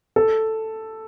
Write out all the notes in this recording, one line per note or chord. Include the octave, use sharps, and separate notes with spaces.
A4